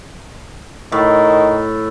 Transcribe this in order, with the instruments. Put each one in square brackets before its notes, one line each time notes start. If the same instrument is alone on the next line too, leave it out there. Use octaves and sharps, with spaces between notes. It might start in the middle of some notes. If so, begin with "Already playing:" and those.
[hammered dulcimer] A2 [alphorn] D#3